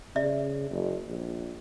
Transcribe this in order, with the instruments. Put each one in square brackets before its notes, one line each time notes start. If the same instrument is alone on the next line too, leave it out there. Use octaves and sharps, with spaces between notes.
[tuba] C#3 [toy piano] D5 E5
[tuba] F#1
A#1